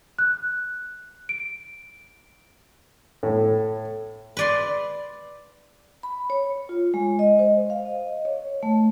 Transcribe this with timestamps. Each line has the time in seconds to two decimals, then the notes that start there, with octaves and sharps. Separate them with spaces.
0.19 F#6
1.29 D7
3.23 A2
4.37 B4 D5 C6
6.03 B5
6.30 C#5
6.69 F4
6.94 G#3
7.19 D#5
7.39 C5
7.70 F5
7.85 D#5
8.25 C#5
8.63 A3